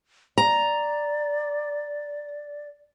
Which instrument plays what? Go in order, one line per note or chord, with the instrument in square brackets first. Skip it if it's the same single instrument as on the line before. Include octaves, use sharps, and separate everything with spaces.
[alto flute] D5 [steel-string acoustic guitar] A#5